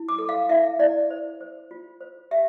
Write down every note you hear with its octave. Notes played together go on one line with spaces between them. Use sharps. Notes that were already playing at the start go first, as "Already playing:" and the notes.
Already playing: E4
D6
A4
F5
E4 E5
E4 D5
C5
C5
F4
C5
G4 E5